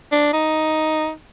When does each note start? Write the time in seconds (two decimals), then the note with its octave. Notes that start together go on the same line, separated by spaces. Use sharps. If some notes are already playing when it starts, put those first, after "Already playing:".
0.12 D4
0.33 D#4